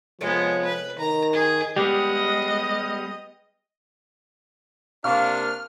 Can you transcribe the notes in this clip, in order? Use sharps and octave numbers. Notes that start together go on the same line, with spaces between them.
C3 F3 G#3 B3 A4 C#5
B4
D#3 A#5
F#2 G#4
G3 G#3 B3 G4 D#5
C3 A#3 D4 F5 C#6 F6